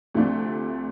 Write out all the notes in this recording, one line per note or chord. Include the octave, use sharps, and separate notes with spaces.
D2 C3 F3 A3 D4